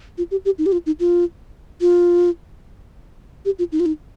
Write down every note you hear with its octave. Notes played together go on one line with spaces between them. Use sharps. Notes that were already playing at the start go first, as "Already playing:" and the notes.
F4
G4
G4
D#4
G4
F4
D#4
F4
F4
G4
F4
D#4
F4
D#4